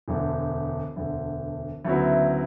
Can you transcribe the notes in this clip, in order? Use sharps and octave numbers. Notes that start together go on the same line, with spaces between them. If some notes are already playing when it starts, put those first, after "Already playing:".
E1 D2 D3
E1 D2 D3
D2 C#3 F#3 B3 E4